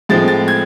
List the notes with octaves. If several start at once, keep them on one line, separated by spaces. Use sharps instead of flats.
A2 F3 G#3 C4 A6
A6
G#6